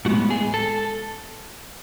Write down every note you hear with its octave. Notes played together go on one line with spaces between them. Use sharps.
A2 G#3 B3 F#4
G#4
A4